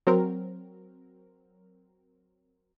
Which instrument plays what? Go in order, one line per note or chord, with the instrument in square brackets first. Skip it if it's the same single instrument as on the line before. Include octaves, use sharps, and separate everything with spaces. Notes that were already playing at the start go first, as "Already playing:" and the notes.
[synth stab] F#3 C4 A#4